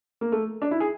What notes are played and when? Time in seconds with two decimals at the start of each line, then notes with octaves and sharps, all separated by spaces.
0.21 A#3
0.32 A3
0.62 D4
0.71 E4
0.80 G#4